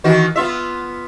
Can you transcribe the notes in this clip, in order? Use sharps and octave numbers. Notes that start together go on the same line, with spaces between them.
D#3 E3 F#4
B3 F4 E5